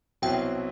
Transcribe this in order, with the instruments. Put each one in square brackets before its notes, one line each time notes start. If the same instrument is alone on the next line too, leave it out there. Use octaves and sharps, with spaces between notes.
[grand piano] C2 B2 F#3 C4 E4 [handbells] G5